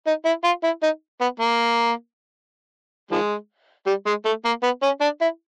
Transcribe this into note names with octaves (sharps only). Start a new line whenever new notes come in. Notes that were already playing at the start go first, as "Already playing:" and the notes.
D#4
E4
F4
E4
D#4
B3
A#3
D#3 F3 G#3
G3
G#3
A3
A#3
B3
C#4
D4
E4